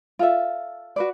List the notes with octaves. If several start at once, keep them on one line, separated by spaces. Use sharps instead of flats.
F4 A4 E5
F#4 B4 D5